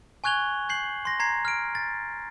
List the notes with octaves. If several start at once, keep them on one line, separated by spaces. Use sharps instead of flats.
G#5 C#6 F#6 G#6 F7 G7
G6 C7 F#7
C6 A#6
A#5 G#6 C7
F6 D7
A6